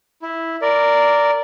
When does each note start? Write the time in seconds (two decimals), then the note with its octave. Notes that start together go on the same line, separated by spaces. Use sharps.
0.22 E4
0.62 A#4 D5